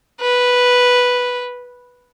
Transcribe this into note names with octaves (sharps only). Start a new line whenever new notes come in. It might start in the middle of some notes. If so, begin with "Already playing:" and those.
B4